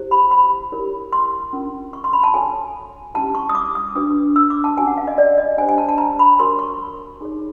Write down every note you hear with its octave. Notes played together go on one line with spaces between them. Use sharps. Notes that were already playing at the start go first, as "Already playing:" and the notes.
Already playing: E4 G4 C5
B5
B5
E4 G4 A#4 C#5
C6
C#4 F4 A#4
C#6
C6
B5
A5
F#4 A4 C#5 G#5
C#4 E4 G4 A5
C#6
D#6
D6
D#6
D4 F#4 B4 D#6
E6
D6
A5
C#4 F#4 B4 G#5
F#5
F5
D#5
D5
D#5
D4 G4 C5 G#5
G#5
A5
A5
A#5
B5
F#4 A#4 C#5 C6
C#6
D#4 G#4 C#5